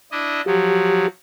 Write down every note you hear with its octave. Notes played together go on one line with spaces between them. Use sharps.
D4 E4 D#5
F3 F#3 G4